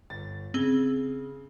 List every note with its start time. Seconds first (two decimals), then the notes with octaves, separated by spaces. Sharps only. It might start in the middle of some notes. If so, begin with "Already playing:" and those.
0.10 G1 A6
0.54 C#3 C4 G#4 G7